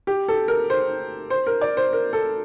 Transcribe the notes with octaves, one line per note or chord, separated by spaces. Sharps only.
G4
A4
A#4
C5
C5
A#4
D5
C5
A#4
A4